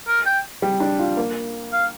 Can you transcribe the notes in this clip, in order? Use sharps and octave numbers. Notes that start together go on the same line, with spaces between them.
A#4
G5
G3
D4
F4
A#3
F5